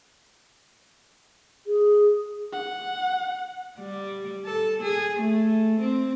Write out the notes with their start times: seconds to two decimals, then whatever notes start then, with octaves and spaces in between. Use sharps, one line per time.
1.67 G#4
2.52 F#5
3.80 G3
4.46 A4
4.83 G#4
5.20 A3
5.80 C4